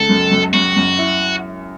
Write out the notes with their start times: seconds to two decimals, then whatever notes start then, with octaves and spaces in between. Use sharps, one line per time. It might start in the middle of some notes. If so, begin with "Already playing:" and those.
Already playing: C#2 A4
0.09 F#2
0.31 F#2
0.53 F#2 F#4
0.76 F#2
0.99 E4